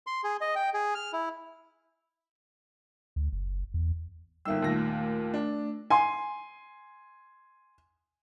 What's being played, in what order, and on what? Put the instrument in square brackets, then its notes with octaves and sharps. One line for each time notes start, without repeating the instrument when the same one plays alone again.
[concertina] C6
G#4
D#5
G5
G#4
F6
E4
[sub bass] D2
F#1
E2
[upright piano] G1 A#3 E6 [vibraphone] G3 D#4 E5
[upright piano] D#2 A#2 A#6 [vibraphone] A3
[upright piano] D4
[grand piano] G#5 C6